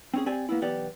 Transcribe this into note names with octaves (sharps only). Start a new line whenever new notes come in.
C4 C#4 G#4
C4 G4 D5 G#5
A#3 B3 E4
B1 E2 B3 G4 D5